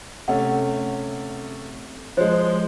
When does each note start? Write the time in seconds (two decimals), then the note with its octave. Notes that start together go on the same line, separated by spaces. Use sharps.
0.28 C3 A3 C#4 F#5
2.17 F3 G#3 C5 C#5